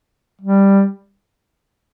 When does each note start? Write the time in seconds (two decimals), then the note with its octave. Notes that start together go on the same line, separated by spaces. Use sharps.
0.41 G3